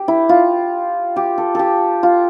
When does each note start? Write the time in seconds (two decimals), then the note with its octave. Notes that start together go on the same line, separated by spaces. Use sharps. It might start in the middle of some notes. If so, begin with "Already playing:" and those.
Already playing: G4
0.08 E4
0.29 F4
1.16 G4
1.38 A4
1.55 G4 A4
2.03 F4